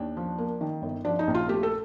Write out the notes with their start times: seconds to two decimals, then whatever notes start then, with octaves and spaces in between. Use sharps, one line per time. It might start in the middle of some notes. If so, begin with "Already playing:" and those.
Already playing: D#2 D4
0.17 F3
0.38 A#3
0.61 D#3
0.82 G1
1.05 F3 D4
1.19 D#4
1.27 A#1
1.35 F4
1.48 A3 G4
1.63 A4